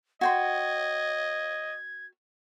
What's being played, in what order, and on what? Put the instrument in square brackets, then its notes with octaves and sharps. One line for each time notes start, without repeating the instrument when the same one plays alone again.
[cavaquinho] F#4 G5 C6 [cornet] D#5 [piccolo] G#6